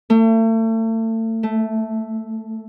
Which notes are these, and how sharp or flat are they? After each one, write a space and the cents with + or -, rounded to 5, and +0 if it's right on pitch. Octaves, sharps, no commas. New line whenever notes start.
A3 +35
A3 -5